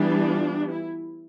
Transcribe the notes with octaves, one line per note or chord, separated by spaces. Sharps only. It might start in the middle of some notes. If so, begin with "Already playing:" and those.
Already playing: E3 G3 B3 D4
F4
E4